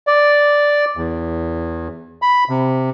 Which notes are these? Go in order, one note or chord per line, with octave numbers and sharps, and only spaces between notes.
D5
E2
B5
C3